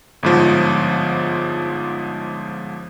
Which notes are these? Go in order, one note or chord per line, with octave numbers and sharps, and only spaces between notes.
G1 G#2 F3